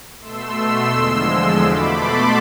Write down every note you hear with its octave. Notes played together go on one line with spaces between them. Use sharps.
B2 A3 C6 E6
E2 D3 F3 G#3
B2 A3 B5 D6
A5 C6